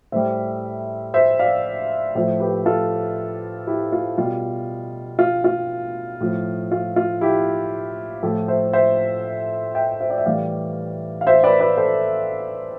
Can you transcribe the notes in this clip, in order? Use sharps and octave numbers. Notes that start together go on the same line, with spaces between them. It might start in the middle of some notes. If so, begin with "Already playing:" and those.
A2 G3 C5 E5
C5 E5
D5 F5
A2 F3 C5 E5
G4 B4
F4 A4
E4 G4
F4
B2 G3 F4
F4
F4
A2 F3
F4
F4
E4 G4
A2 F3 F4 A4
C5 E5
C5 E5
E5 G5
C5 E5
D5
E5
A2 E3 G3 D5 F5
F5
C5 E5
B4 D5
B4 D5
A4 C5